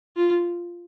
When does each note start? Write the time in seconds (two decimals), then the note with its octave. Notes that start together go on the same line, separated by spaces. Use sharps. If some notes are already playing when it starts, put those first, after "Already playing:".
0.17 F4